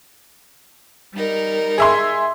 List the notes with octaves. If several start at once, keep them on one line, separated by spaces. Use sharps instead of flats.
G3 D#4 A#4
G#4 E5 C6